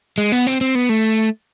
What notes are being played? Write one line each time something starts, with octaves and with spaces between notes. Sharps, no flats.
G#3
B3
C4
C4
B3
A3